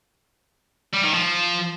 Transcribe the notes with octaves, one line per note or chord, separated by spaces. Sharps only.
G3
D#3
F3